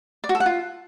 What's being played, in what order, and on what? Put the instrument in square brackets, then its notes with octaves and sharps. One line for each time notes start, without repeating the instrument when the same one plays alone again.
[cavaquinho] D5
F#4
A4
F#5
F4